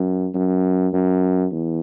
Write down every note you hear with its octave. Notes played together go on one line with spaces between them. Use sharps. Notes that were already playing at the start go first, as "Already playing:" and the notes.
Already playing: F#2
F#2
F#2
E2